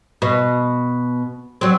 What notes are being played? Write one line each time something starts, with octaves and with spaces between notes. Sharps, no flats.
B2
F#3 C4